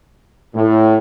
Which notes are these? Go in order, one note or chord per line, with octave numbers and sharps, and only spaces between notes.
A2